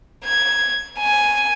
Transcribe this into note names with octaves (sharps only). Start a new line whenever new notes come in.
G#6
G#5